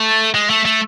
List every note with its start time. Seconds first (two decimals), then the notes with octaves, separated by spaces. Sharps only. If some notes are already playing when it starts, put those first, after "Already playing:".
Already playing: A3
0.35 G#3
0.50 A3
0.65 A3